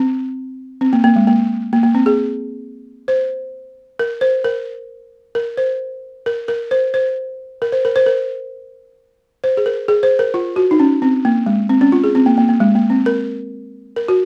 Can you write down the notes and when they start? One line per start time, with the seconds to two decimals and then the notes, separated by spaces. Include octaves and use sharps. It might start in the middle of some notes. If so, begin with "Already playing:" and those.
Already playing: C4
0.81 C4
0.93 A#3
1.04 A#3
1.16 G#3
1.27 A#3
1.73 A#3
1.83 A#3
1.95 C4
2.06 G#4
3.08 C5
3.99 A#4
4.21 C5
4.44 A#4
5.35 A#4
5.57 C5
6.26 A#4
6.48 A#4
6.71 C5
6.94 C5
7.62 A#4
7.72 C5
7.85 A#4
7.96 C5
8.06 A#4
9.44 C5
9.57 G#4
9.66 A#4
9.88 G#4
10.03 C5
10.19 A#4
10.34 F4
10.56 F#4
10.71 D#4
10.80 C#4
11.02 C4
11.25 A#3
11.46 G#3
11.69 C4
11.81 C#4
11.92 F4
12.04 G#4
12.15 C4
12.26 A#3
12.38 A#3
12.49 A#3
12.60 G#3
12.75 A#3
12.90 C4
13.06 A#4
13.96 A#4
14.08 F#4